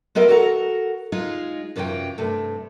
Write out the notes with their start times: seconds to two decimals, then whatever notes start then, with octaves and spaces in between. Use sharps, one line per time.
0.15 G#3 B3 A#4 D#5 E5
0.29 F#4 A4 A#4 F#5 G5 A#5
1.12 G#3 D#4 F4 G#4
1.76 F#2 C3 E3 C#4 F4 G5
2.18 G2 C3 A3